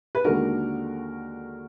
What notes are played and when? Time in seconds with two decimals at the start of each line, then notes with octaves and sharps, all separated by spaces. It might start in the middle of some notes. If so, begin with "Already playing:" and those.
0.15 B4
0.25 D#2 D3 G#3 D4 F#4 A#4